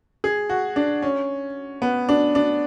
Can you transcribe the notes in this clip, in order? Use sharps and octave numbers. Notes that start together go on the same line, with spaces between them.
G#4
F#4
D4
C#4
B3
D4
D4